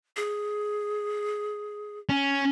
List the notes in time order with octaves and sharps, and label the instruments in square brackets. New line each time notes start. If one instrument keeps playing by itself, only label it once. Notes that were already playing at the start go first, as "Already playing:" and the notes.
[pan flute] G#4
[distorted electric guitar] C#4